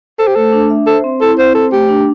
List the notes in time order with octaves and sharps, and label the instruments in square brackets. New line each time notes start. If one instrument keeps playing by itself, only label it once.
[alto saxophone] A4 [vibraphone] C5
[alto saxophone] G4
[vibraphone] A3 [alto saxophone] A4
[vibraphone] D4
E5
[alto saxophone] A4 [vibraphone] C5
[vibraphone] C4
[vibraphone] E4 [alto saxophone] A4
[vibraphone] C4 [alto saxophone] C5
[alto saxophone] A4 [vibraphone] C5
[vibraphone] A3 [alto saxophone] G4
[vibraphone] D4